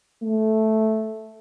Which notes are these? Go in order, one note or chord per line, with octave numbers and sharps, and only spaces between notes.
A3